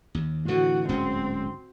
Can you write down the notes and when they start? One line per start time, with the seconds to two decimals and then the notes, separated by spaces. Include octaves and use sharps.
0.15 D#2
0.48 A2 D3 E3 F#4
0.89 D1 G#2 C4 C#4